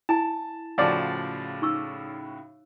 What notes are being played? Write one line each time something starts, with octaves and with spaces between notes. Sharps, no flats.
E4 G#5 A5
A2 C#3 F3 F#4 D5 F#5 G#5 A5
D#4 C#6 E6